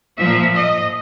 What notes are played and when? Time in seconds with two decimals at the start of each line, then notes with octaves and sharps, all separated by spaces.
0.18 A#2 F3 E5
0.55 D#5